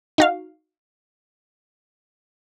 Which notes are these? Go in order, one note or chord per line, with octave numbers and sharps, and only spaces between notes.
D#4 F#4 F5